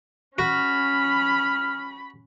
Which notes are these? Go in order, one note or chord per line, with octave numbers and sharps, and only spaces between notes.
C#4 F#4 B5 F6